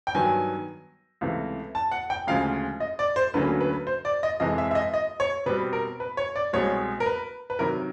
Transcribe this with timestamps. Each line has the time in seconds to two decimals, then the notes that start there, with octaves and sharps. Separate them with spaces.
0.07 G5
0.15 G2 D#3 F#3 B3 G#5
1.21 C#2 C3 E3 A3
1.75 A5
1.91 F#5
2.10 G5
2.27 D2 C#3 F3 G#3 F5
2.80 D#5
2.99 D5
3.16 C5
3.34 D2 D3 F#3 A#3 C#4 B4
3.61 B4
3.87 C5
4.05 D5
4.23 D#5
4.40 F2 C3 E3 G#3 D#5
4.58 E5
4.71 E5
4.75 D#5
4.94 D#5
5.20 C#5
5.46 B2 G3 C4 B4
5.73 A#4
6.00 B4
6.17 C#5
6.36 D5
6.53 C2 B2 G#3 C4 C#5
7.00 A#4
7.06 B4
7.50 B4
7.59 C3 D#3 F#3 A#4